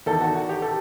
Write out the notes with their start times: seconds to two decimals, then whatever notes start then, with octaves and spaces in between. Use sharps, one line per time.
0.06 E2 D#3 A4
0.21 F#4
0.35 F#4
0.49 G4
0.62 A4